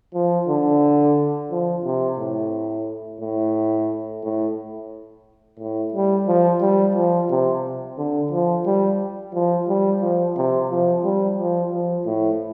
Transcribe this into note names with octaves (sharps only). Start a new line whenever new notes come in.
F3
D3
F3
C3
A2
A2
A2
A2
G3
F3
G3
F3
C3
D3
F3
G3
F3
G3
F3
C3
F3
G3
F3
F3
A2